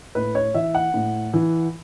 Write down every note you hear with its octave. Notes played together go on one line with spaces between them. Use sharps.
A2 B4
C#5
E3 E5
F#5
A2
E3